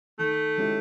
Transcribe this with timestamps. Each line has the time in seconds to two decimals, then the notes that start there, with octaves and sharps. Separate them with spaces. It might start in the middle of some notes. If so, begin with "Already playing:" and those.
0.19 D#3 A3
0.58 G#3 C#4 E4 G4